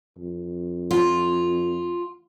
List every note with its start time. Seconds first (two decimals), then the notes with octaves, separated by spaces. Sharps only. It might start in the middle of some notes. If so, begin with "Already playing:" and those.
0.18 F2
0.91 F4